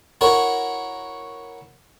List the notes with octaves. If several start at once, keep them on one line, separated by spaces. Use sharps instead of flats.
E4 F#4 A#4 C#5